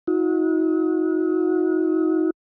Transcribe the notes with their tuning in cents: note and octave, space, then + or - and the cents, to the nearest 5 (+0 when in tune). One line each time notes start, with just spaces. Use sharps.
D#4 +40 F#4 -30